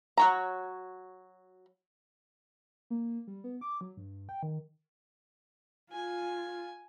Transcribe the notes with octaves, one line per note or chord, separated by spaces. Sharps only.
F#3 C#5 A#5
A#3
G3
B3
D6
F#3
G2
G5
D#3
F4 G#5